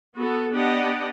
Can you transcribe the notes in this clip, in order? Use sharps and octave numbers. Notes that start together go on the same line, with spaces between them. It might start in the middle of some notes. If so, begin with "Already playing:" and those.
B3 F#4 A4
B3 D4 G4 D5 D#5 F#5